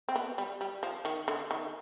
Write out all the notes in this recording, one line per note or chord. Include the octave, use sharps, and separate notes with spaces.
C4
B3
G3
G3
F3
D#3
D3
D#3